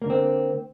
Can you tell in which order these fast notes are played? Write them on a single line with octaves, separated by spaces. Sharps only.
A#3 D3 C4